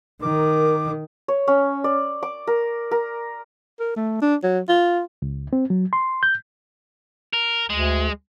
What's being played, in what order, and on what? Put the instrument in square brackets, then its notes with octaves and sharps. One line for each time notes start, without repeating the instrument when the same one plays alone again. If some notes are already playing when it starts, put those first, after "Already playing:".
[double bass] D#3 [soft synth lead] A#4 [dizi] D6
[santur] C#5
C#4
D5
D6
A#4
A#4
[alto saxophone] A#4
A3
D4
F#3
F4
[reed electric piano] C#2
C4
F#3
C6
G6
[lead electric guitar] A#4
[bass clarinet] D2 [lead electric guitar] G#3